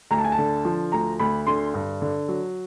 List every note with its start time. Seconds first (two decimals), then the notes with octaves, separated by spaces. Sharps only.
0.11 D2 A#5
0.18 A5
0.24 G#5
0.32 A5
0.38 D3
0.65 F3
0.92 D2 A#5
1.20 D2 B5
1.47 D3 C6
1.74 G2
2.02 D3
2.28 F#3